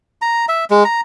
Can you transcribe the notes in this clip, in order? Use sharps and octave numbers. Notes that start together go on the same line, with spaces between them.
A#5
E5
G#3
A#5